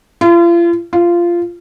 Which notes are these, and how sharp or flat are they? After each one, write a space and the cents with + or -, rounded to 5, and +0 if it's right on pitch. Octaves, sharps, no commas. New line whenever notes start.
F4 -40
F4 -15